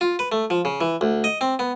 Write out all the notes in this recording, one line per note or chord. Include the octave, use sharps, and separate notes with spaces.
F4
B4
A3
F3
C#3
E3
D2
D#5
C4
B3